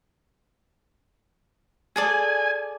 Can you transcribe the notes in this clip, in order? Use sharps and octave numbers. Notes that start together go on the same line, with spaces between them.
G#4 A4 D5 G#5